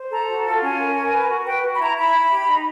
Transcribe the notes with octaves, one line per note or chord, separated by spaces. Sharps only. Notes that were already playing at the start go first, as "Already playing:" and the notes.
Already playing: C5
A4 A#5
F#4
F4 A5
C#4 G#5
A#4
A#4
B4
F#4
B4 G5
F#4
B5
E4 A#5
E4 B5
E4
G4
D#4